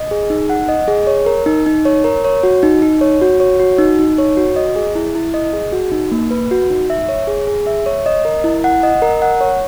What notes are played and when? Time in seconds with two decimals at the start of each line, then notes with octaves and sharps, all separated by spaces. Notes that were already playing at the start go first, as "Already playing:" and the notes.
Already playing: D#5
0.11 G#4
0.30 D#4
0.50 F#5
0.69 D#5
0.88 G#4
1.07 C#5
1.26 A#4
1.46 D#4
1.66 D#4
1.85 C#5
2.04 A#4
2.24 C#5
2.43 F#4
2.63 D#4
2.82 D#4
3.01 C#5
3.21 F#4
3.40 C#5
3.60 F#4
3.78 D#4
3.99 D#4
4.18 C#5
4.37 F#4
4.56 D#5
4.76 G#4
4.95 E4
5.15 E4
5.34 D#5
5.53 G#4
5.72 F#4
5.92 D#4
6.12 A#3
6.30 B4
6.51 F#4
6.70 D#4
6.90 E5
7.09 C#5
7.27 G#4
7.47 G#4
7.67 E5
7.86 C#5
8.06 D#5
8.25 A#4
8.44 E4
8.64 F#5
8.83 D#5
9.02 A#4
9.22 F#5
9.41 C#5